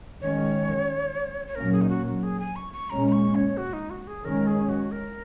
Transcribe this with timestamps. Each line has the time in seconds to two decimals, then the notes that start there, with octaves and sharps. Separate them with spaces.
0.21 D#3 G#3 C#4 C#5
1.47 C#5
1.55 A#2 F#3 A#3 C#4 A#4
1.73 G#4
1.82 D#4
1.89 F#4
2.06 F#4
2.23 G#4
2.40 G#5
2.56 C#6
2.73 C#6
2.90 A#2 G#3 C#4 A#5
3.07 A#5
3.12 C#6
3.35 C#5
3.57 F#4
3.73 D#4
3.90 F#4
4.07 G#4
4.24 D#3 G#3 C#4 A#4
4.47 G#4
4.69 F#4
4.92 A#4